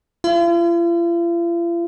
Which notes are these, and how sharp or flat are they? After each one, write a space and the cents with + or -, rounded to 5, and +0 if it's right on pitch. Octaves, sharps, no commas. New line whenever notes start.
F4 -45